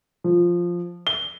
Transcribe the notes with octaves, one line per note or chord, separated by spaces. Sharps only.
F3
G7